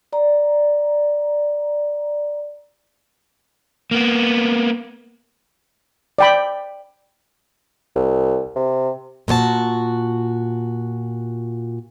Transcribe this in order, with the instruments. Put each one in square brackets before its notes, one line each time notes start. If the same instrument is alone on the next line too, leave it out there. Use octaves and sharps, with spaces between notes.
[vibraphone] D5 A#5
[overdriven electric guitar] A#3 B3
[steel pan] D5 G5 B5
[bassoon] C2
C3
[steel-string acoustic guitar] A#2 F#4 C#5 A5